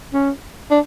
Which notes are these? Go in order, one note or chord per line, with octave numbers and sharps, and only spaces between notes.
C#4
D4